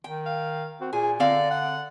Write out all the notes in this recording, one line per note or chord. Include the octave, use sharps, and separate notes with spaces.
D#3 G5
F5
C4 F#4
A#2 G#4 G#5
D3 C4 D5 F5
F#5